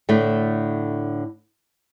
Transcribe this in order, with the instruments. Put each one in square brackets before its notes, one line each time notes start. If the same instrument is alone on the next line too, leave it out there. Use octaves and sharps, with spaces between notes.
[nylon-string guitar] A2 D3 A3